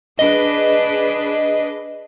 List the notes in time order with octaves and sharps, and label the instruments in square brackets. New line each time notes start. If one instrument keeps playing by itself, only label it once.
[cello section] D4 G#4 B4 [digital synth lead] D#5